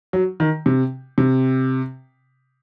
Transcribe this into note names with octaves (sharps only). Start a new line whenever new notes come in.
F#3
D#3
C3
C3